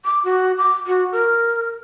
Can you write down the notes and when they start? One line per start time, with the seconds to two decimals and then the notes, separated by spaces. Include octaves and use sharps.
0.05 D6
0.24 F#4
0.58 D6
0.87 F#4
1.12 A#4